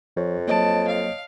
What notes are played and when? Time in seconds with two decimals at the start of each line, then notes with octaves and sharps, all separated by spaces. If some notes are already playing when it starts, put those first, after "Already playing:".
0.17 F2 F3 C#5
0.48 F#3 A#3 C#5 D#5 A5 D7
0.88 F5